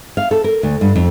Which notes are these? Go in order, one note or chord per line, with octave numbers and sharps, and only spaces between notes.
F5
A4
A#4
D2
G2
F2